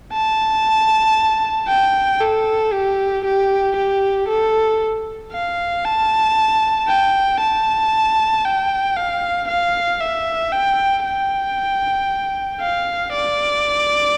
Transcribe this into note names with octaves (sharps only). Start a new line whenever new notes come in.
A5
G5
A4
G4
G4
G4
A4
F5
A5
G5
A5
G5
F5
F5
E5
G5
G5
F5
D5